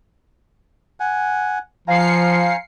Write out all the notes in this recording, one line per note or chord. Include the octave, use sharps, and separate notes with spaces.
F#5 G#5
F3 C5 F5 G#5 A#5 C7 C#7